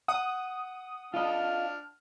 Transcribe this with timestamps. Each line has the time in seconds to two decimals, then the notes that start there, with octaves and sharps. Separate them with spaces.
0.08 F#5 D#6
1.14 D4 F4 D#5 F6